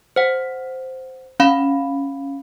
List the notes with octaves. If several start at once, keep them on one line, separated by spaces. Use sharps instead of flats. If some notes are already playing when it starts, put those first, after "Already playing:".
C5 F#5
C#4 F5 B5